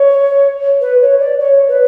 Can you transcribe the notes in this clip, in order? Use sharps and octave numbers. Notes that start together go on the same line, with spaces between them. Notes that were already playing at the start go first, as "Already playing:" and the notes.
Already playing: C#5
B4
C#5
D5
C#5
B4